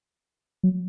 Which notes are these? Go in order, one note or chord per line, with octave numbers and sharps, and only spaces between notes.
F#3